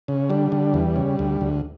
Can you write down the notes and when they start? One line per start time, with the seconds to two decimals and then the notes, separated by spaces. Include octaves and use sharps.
0.08 C#3
0.30 D3 G3
0.52 D3
0.74 E2
0.96 C#3
1.19 D2
1.41 D2